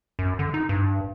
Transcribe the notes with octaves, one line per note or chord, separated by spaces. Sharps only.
F#2
D3
D#4
G2